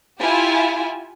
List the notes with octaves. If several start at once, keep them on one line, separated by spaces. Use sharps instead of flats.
E4 F4 G4 G#5